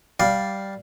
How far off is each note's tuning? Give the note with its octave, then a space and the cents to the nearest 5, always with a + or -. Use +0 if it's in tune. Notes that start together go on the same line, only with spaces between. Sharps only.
G3 -5 D5 +0 F5 +0